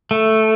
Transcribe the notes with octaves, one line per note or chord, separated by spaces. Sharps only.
A3